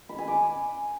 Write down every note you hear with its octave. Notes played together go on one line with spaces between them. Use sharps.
B5
G#5
D6